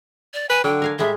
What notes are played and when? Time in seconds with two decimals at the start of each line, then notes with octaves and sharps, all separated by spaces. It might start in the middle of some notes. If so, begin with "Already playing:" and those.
0.34 D5
0.49 B4 G#5
0.64 D3 F#3 G5
0.82 A#4 F5 G#5
0.99 A2 G3 G#3 E5